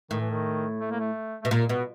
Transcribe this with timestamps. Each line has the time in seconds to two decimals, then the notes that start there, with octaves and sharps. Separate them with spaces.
0.11 A2 D#3
0.21 E3
0.30 D#3
0.81 A3
0.91 A#3
1.00 A3
1.42 B2 A3
1.51 A#2 A#3
1.69 B2 B3